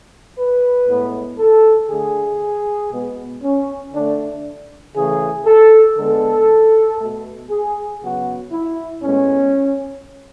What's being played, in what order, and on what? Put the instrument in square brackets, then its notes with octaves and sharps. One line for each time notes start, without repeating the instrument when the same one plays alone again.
[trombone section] B4
A2 G#3 B3
A4
D3 A3 G#4
B2 G#3 B3
C#4
D3 A3 D4
C#3 E3 A3 G#4
A4
D3 G#3 B3 A4
B2 A3
G#4
C#3 F#3 B3 F#4
E4
A2 G#3 B3 C#4